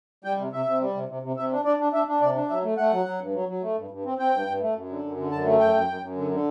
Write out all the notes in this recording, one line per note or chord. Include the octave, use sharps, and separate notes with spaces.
G3 G5
C3
C3 E5
C3
G3
C3
C3
C3
C3 E5
D4
D4 D5
D4
D4 E5
D4
C3 D5
D4
F#3 E5
A3
A3 F#5
F#3
F#3
G2
F#3
F#3
A3
G2
G2
C4
C4 G5
G2
G2
A3
F#2
D3
F#2
D3
F#2 A5
A3
F#2 G5
F#2
F#2
F#2
D3
D3